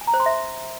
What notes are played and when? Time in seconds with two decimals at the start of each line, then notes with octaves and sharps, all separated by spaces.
0.01 G#5
0.07 A#5
0.14 C5
0.20 C6
0.26 E5